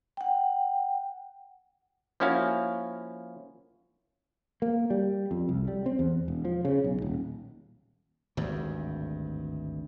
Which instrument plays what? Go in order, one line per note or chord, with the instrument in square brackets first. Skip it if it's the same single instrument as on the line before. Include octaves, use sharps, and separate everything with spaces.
[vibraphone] F#5 G5
[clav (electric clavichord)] F3 A#3 C#4 E4 F#4 F5
[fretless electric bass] A#3
G3
F2
C2
G3
C4
E2
E1
F3
C#3
B1
D#1
[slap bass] G#1 D2 G2